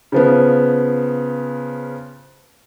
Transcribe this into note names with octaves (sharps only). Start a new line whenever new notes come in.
C#3 F3 B3